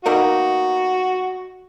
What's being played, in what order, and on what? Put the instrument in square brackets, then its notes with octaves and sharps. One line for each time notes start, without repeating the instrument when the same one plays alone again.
[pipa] B2 A#3 D#4 [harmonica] F#4